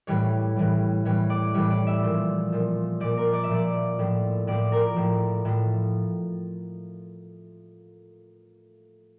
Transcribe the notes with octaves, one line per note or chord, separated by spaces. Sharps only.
A2 E3 G3 C#5
A2 E3 G3
A2 E3 G3 C#5
D5
A2 E3 G3 C#5
D5
E5
A#2 F3
A#2 F3
A#2 F3 D5
A#4
D5
E5
A#2 F3 D5
A2 F3
A2 F3 D5
A#4
A2 F3
A2 F3